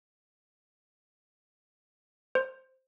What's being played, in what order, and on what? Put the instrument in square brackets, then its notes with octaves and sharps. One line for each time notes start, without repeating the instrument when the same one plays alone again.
[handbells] C5